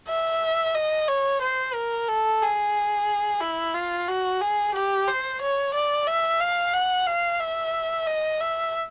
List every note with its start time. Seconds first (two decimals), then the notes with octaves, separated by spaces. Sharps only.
0.08 E5
0.75 D#5
1.08 C#5
1.41 C5
1.75 A#4
2.08 A4
2.42 G#4
3.41 E4
3.74 F4
4.08 F#4
4.41 G#4
4.74 G4
5.08 C5
5.41 C#5
5.74 D5
6.07 E5
6.41 F5
6.74 F#5
7.07 F5
7.40 E5
8.07 D#5
8.40 E5